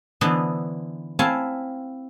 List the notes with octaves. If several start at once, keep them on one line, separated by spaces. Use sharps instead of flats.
D3 E3 B3 C5 D#5 A5
C4 E4 C#5 F5 G#5 A5